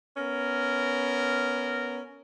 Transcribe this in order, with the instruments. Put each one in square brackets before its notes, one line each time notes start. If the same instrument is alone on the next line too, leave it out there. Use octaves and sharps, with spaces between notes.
[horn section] B3 C#4 A#4